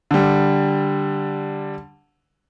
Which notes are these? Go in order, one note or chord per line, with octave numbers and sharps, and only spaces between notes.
D3 G3